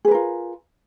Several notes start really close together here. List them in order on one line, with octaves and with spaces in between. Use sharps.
G#4 B4 A#4 F4